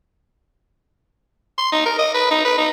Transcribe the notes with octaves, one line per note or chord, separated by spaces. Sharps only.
C6
D#4
A#4
D#5
B4
D#4
B4
D#4